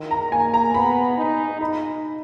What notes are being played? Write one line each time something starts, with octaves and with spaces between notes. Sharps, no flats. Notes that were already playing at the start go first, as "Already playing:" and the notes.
Already playing: D#3
A#5
A#3 G#5
A#5
B3 B5
D#4
D#4 B5